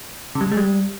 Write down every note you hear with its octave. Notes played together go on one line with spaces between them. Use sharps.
C#3
G3
C#3
G#3
G3